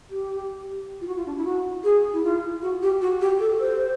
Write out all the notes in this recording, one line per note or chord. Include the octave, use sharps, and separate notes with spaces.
G4
F4
F#4
F4
D4
E4
F#4
G#4
E4
F4
F#4
G4
F#4
G4
A4
C5